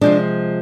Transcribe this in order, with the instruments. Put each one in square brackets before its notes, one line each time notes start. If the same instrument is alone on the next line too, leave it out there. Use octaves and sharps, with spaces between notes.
[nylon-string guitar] C3 F3 G#3 D4